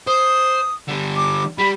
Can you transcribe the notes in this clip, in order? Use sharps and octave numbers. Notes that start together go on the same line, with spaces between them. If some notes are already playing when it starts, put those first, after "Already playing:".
C5 D#6
D3 G3
D6
G3 G4 B5